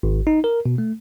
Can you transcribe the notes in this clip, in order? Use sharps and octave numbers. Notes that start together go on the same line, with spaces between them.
G#1
D#4
A#4
B2
A3